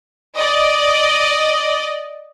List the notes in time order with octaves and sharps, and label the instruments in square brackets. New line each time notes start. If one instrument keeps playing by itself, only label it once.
[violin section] D5 D#5